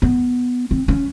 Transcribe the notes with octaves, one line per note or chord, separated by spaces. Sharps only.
B3
C4
C#4